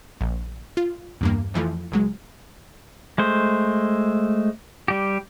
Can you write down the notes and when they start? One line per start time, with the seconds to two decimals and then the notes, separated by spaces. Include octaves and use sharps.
0.21 A#1
0.77 F4
1.21 E2 G2 A#3
1.54 F2 E3 F3 A3
1.92 C#2 F#3 G#3
3.18 G#3 A3 C5
4.88 G3 G4